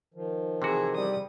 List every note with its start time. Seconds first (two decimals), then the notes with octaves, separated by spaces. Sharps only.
0.14 D#3 F3
0.62 C3 E3 F#4 G#4
0.96 G3 D#6